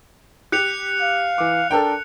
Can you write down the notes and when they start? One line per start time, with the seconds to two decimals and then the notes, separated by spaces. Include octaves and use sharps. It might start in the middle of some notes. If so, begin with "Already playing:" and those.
0.52 G4 F#6 C#7 F7
1.01 F5
1.38 E3 D6
1.71 D4 A4 A#4 G5